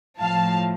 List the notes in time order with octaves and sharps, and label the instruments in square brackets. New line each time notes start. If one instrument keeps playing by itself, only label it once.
[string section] A2 F3 F5 A5